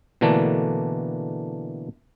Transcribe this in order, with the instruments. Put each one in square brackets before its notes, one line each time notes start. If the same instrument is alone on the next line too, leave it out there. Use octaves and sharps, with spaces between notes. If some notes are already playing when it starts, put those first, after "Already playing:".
[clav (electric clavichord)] B2 D3 E3 A3 A#3 D4